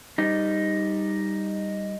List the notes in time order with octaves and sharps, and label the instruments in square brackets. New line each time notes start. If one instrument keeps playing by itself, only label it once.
[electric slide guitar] G3 D#4